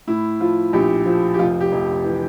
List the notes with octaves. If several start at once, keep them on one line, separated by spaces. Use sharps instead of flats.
A2 E4
F3 F4
A#1 G4
F3
G4
F1 F4
G4
F1
E3